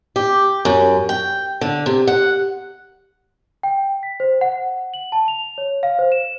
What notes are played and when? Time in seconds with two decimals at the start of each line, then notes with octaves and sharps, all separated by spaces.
0.16 G4
0.65 F#2
1.09 G5
1.61 D3
1.86 C3
2.07 F#5
3.63 G5
4.03 B6
4.20 C5
4.41 F#5
4.94 F#7
5.12 A5
5.28 F7
5.58 C#5
5.83 F5
5.99 C5
6.12 E7